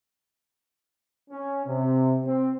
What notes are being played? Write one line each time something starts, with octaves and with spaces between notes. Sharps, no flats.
C#4
C3
C4